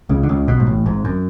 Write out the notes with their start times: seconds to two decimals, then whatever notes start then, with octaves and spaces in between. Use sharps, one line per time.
0.09 C#2 C#3
0.23 D3
0.29 C#2 C#3
0.47 B1 B2
0.60 G#2
0.67 A1 A2
0.86 G#1 G#2
1.05 F#2